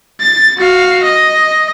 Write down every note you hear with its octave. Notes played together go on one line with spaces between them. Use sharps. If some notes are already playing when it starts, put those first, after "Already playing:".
A6
F#4 F5
D#5